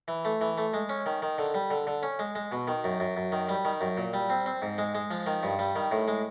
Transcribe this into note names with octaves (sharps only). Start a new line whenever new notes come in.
E3
A3
E3
A3
G#3
C#4
D#3
D#3
D3
G3
D3
D3
C#4
G#3
G#3
B2
D#3
F#2
F#2
F#2
D#3
G3
D#3
F#2
A#2
G3
C4
C4
G#2
G#3
G#3
F3
D#3
G2
G3
D#3
A2
G#3